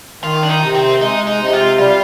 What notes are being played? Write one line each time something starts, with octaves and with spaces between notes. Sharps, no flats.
D#3 F4
D4
D#4
C3
C4
G#3 D#4
D#4
C3
D#4
F4
G3 F4